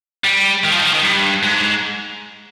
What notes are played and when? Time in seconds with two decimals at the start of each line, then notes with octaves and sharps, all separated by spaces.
0.24 G3
0.64 D#3
0.71 F3
0.78 D#3
0.85 F3
0.93 D#3
1.03 G2
1.43 G#2